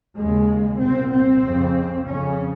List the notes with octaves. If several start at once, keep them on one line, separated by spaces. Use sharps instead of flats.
D#2 C#3 G#3
C2 A#2 C4
C4
F2 C#3
F2 C#3 C#4